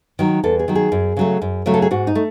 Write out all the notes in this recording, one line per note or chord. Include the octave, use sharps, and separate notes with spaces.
D#3 F#3
E2 A4
G#4
D#3 F#3
G#4
F#2
C#3 F#3 A3
F#2
C#3 F#3 A3
A4
G#4
G#2 F#4
D#4
A3